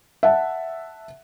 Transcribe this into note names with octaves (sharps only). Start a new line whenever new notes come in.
E5 F#5 A5